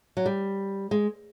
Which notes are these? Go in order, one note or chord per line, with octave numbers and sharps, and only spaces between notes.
F#3
G3
G#3